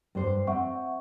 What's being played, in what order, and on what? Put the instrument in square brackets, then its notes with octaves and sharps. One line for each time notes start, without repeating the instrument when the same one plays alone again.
[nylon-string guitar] G2 C5
[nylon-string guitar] C4 [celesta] E5 F#5 C#6